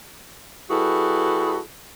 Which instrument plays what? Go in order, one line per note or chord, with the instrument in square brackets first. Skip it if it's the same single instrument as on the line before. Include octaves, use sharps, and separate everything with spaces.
[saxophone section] G3 E4 F#4 G#4 A4 B4